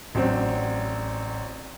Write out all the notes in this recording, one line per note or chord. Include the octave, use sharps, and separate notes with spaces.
A1 F#3 C4 D4